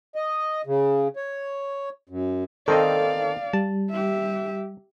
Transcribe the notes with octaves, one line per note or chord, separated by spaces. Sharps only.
D#5
C#3
C#5
F#2
D#3 C4 A4 D5 D#5 F5
G3 A5
G4 E5